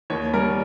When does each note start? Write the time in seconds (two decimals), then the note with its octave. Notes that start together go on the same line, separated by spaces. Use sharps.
0.10 D#2 C#5
0.34 G3 A#4